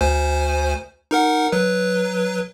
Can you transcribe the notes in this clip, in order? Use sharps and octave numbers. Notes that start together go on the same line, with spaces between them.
D2 C5 G#5
D#4 A#4 F#5
F#3 B4